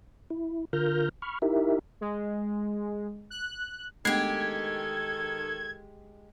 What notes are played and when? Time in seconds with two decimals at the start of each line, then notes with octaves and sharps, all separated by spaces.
0.30 E4
0.73 D3 F4 A#4 F6 G6 A#6
1.22 B5 C#6 F6
1.42 D#4 E4 G4 A#4 E5
2.01 G#3
3.30 F#6
4.05 D#3 G#3 A3 B3 D4 G4 A4 G#6